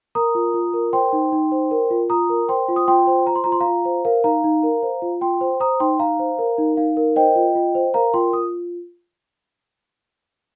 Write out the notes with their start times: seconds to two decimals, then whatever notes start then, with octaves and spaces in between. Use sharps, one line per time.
0.15 A#4 A#5 D#6
0.35 F4
0.54 F4
0.74 A#4
0.93 C5 G5 C6
1.13 D#4
1.32 D#4
1.52 C5
1.71 A#4
1.91 F4
2.10 F4 A#5 D#6
2.30 A#4
2.48 C5 G5 C6
2.69 F4
2.76 D#6
2.88 F4 G5 C6
3.07 C5
3.27 C5 A#5
3.35 C6
3.44 F4 A#5
3.52 C6
3.60 F5 A#5
3.66 F4
3.85 C5
4.05 A#4 F5
4.24 D#4 F5 A#5
4.44 D#4
4.63 A#4
4.83 C5
5.02 F4
5.21 F4 G5 C6
5.41 C5
5.60 C5 A#5 D#6
5.80 D#4 G5 C6
5.99 D#4 F5 A#5
6.19 C5
6.39 A#4
6.58 D#4
6.77 D#4 F5
6.97 A#4
7.16 C5 D#5 G5
7.36 F4
7.55 F4
7.75 C5
7.94 A#4 F5 A#5
8.14 F4 G5 C6
8.33 F4 D#6